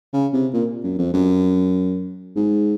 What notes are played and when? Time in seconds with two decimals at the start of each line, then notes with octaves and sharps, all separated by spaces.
0.13 C#3
0.33 C3
0.54 A#2
0.84 F#2
0.99 F2
1.14 F#2
2.36 G#2